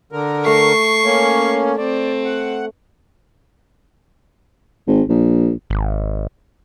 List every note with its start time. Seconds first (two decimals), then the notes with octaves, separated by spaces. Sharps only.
0.12 D3 A#4
0.46 A3 C#6 C7
1.04 A#3 C#4
1.78 C4 D5
2.25 F#5
4.88 G#1
5.09 A#1
5.70 G#1